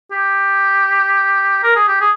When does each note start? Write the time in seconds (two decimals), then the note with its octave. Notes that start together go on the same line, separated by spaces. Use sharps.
0.11 G4
1.63 A#4
1.76 G#4
1.88 G4
2.01 G#4